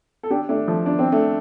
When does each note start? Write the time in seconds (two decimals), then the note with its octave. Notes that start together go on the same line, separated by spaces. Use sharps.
0.23 A4
0.30 D4 G4
0.49 A3 D4
0.67 F3 A3
0.86 D4
0.99 C4
1.12 A3 D4